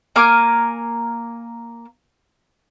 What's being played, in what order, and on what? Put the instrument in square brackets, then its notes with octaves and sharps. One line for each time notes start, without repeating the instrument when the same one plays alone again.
[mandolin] A#3 A#4 G#5 D6